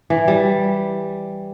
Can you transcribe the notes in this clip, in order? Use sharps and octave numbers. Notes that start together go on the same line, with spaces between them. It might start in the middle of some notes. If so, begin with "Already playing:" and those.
E3
G3